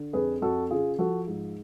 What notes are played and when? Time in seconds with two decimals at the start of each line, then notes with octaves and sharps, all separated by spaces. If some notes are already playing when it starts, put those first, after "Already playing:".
Already playing: D3
0.13 F2 G#4 B4
0.42 F2 F#4 A4
0.70 C#3 F4 G#4
0.99 F3 F#4 A4
1.27 G#2